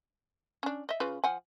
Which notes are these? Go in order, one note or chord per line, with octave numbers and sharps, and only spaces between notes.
C#4 D4
D#5 E5
C#3 F4 B4
F3 F#5 G#5